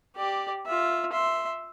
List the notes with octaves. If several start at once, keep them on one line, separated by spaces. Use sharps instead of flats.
G4 D5
F4 E5
E5 C6